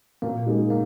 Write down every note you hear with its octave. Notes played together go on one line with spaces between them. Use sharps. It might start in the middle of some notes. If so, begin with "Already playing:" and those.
A#2 A#3
G#3 D#4 A#4
A#3